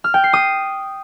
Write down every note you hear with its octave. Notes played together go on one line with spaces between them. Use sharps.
F6
G5
C7
D#6